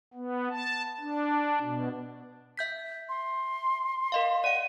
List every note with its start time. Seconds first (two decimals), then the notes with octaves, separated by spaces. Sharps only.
0.14 B3
0.51 A5
1.00 D4
1.61 B2
2.57 E5 G6 B6
3.09 C6
4.12 A#4 D#5 F5
4.44 D5 F#5 D#7